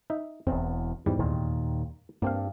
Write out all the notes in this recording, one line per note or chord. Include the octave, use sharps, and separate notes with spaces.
D#4 E5
E1 E2 C4
E2 G#2 G3
D#2 A#2 D#3
G2 A#3 C4 F5